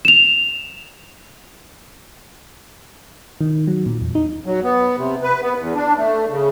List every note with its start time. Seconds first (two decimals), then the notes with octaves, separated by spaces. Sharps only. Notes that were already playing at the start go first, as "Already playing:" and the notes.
0.05 E7 F7
3.41 D#3
3.68 F#3
3.86 A#2
4.01 E2
4.15 D#4
4.46 F#3
4.63 B3
4.97 C3
5.23 B4
5.42 B3
5.59 E2
5.75 D4
5.97 A3
6.30 C#3